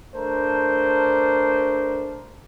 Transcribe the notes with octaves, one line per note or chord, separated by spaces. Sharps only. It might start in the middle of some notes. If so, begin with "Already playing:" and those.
A3 D4 A#4 C5